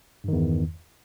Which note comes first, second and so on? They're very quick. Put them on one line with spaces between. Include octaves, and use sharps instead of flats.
G2 D#3 E2